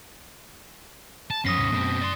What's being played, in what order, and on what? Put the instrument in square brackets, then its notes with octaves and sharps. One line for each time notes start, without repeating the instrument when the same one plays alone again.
[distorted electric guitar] A5
[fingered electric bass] F#2 F3 [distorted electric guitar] B3 C#4 [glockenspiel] D#6 A#6 C7
[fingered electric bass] D#2 G#2 C3
[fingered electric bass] F#2 A3 C#4 [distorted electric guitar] B2 C4
[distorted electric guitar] D5 C6